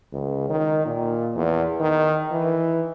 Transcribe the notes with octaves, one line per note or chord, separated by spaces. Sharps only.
C#2
D#3
A#2
E2
D#3
E3